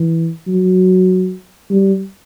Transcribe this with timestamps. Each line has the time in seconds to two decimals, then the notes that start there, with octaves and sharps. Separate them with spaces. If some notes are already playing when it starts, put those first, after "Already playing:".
Already playing: E3
0.47 F#3
1.71 G3